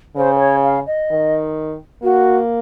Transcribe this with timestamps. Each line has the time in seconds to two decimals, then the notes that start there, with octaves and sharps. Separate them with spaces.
0.16 C#3 C5
0.35 C5
0.39 C#5
0.63 F5
0.87 D#5
1.10 D#3
2.03 A#3 F#4